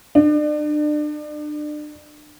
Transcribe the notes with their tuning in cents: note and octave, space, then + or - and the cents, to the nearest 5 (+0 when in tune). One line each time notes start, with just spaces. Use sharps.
D4 +35